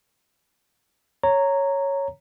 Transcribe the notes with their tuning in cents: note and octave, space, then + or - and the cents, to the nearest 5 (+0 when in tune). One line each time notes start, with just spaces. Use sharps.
C#5 +0 A#5 -10